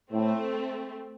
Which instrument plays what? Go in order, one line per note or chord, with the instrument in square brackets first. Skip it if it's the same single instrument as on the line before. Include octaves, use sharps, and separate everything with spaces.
[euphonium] A2 [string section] A3 C4